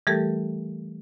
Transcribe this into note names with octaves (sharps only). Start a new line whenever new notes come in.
E3 G3 A3 G4 A4 A#4